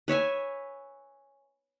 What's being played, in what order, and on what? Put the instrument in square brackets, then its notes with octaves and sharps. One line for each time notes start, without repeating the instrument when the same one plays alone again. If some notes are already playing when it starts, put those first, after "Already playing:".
[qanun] B4 C#5 E5 G#5